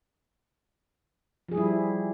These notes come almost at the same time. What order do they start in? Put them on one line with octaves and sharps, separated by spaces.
F3 G#4 G3 E4